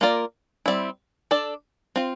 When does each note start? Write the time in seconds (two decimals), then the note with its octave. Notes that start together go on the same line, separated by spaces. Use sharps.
0.01 A#3 F4 A#4 D5
0.66 G3 C4 E4
1.31 D4 A4 D5
1.96 C4 F4